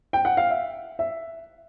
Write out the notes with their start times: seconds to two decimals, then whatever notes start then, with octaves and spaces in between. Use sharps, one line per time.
0.13 G5
0.25 F#5
0.37 F5
0.50 E5
0.99 E5